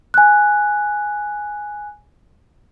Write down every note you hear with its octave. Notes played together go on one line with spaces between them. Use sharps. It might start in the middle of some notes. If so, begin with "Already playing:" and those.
G#5 F#6